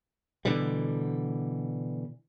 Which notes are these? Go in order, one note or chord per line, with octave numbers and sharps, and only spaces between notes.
B2 D3 E3 G3